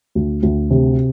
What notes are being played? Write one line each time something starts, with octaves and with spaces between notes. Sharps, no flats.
D2
D2
C3